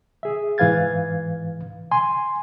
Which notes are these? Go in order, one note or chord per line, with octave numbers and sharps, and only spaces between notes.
G#4 E5
G#2 E3 B4 F5 G#6 A6
G#5 C6